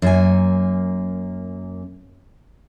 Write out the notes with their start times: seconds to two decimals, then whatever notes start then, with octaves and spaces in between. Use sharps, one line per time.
0.02 F#2 A#3 G#5